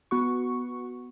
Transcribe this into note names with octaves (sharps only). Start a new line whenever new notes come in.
B3 F#4 C#6